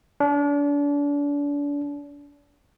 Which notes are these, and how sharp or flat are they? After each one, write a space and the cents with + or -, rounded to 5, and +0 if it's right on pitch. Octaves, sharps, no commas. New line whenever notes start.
D4 -35